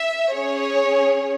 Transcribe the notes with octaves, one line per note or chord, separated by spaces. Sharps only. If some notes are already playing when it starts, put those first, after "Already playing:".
Already playing: E5
C#4 G#4 C#5